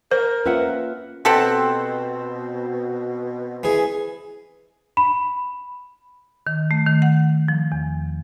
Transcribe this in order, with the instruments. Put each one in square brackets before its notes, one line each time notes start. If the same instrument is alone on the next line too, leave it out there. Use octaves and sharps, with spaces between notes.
[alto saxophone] A#4 [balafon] C5
[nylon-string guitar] A#3 C#4 F4 [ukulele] B4 E5 F#5
[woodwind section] B2 [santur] C4 A5 [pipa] G4 A4 F#5
[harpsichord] E3 G#4
[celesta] B5
[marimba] D#3
A3
D#3
F#5
F3
E2